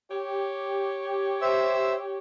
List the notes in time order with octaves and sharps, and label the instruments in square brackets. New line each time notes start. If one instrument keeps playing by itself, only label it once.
[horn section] G4 C#5
[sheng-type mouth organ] C5 E5 E6